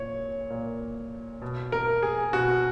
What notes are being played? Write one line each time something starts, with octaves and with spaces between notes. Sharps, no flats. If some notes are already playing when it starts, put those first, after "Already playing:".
Already playing: A#2 C#5
A#2
B2
A#4
G#4
B2 F#4